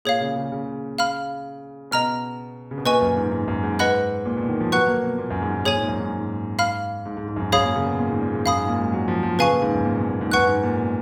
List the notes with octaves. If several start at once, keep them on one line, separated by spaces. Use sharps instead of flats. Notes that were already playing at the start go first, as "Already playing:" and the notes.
A#2 G#4 C#5 F5
C#3
C#3
C#3
F5 B5 F6
B2 D#5 A#5 F6
C#3
B2
A#2 B4 D#5 G#5 C#6
F#2
G#2
G#2
F#2
G#2
B4 D#5 F#5 B5 F#6
A#2
B2
D#3
F3
F#3 B4 F#5 C#6 F#6
A#3
B2
A#2
F#2
G#2
G#2
A#2 G#4 C#5 G#5
G#2
F#2
G#2
G#2
F5 B5 F6
G#2
G#2
G#2
F#2
G#2
F#2 G#4 C#5 F5 B5 D#6
A#2
C#3
B2
A#2
G#2
A#2
G#2
F#2 F5 B5 D#6
G#2
A#2
G#3
F#3
F3
F3
C#3 B4 F5 G#5 C#6
A#2
G#2
F#2
A#2
B2
A#2
G#2
F#2 B4 F#5 C#6 F#6
G#2
A#2
B2